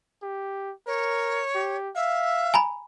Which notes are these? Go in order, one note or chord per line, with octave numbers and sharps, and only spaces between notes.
G4
A#4 C#5
G4
E5 F5
G#5 A#5 B5